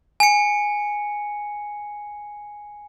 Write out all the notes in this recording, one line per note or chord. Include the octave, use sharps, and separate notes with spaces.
G#5 C#7